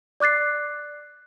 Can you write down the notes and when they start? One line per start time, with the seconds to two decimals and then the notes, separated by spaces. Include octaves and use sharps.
0.20 D5 D6 F#6 A6 C7